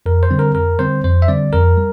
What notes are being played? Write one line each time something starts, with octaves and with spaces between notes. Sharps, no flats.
F2 A#4
C5
D3 G3 C4
A#4
F2 A#4
D3 G3 C4 C5
F2 C5
E5
D3 G3 C4 D5
F2 A#4
G3